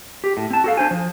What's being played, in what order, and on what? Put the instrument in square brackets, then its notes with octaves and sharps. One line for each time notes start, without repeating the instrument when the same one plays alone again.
[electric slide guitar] G4
A2
C4 A5
F#4 A4 F5
D4 C5 G#5
F3